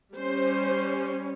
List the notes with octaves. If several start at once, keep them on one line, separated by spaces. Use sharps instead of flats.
G3 C#4 C5